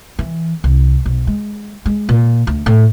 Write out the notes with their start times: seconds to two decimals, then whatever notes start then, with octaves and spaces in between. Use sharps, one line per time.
0.19 E3
0.64 C2
1.06 B1
1.27 G#3
1.86 G#3
2.09 A#2
2.47 D2
2.66 A2